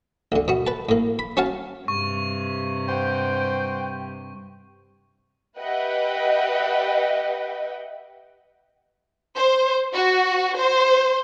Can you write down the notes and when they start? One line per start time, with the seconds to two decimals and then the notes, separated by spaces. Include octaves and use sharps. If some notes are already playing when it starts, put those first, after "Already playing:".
0.32 D2 D3
0.48 B2 F#4
0.67 B4 A5
0.89 A2 A#3
1.19 B5
1.37 C#4 F#4 C#5 F5 A5
1.88 G2 C3 C#6
2.88 C5 F#5 G5
5.58 G4 B4 D#5 E5 F#5 G5
9.36 C5
9.94 F#4
10.56 C5